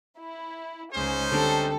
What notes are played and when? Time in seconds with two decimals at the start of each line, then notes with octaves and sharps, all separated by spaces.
0.19 E4
0.94 C#2 C#4 D#4 G#4 C5
1.32 D3 G3 C4 A4